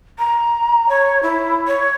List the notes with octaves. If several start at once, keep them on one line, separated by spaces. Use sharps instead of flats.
A#5
C#5
E4
C#5